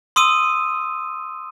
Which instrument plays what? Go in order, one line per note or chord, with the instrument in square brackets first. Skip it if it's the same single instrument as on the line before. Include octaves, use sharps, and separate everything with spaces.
[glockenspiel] C6 D#6 E6 D#7